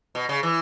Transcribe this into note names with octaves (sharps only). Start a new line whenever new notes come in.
B2
C#3
E3